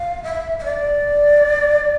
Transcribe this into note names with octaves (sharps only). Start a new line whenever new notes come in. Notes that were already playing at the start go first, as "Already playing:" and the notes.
Already playing: F5
E5
E5
D5